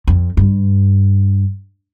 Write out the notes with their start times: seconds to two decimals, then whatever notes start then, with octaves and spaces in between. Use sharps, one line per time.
0.07 F2
0.37 G2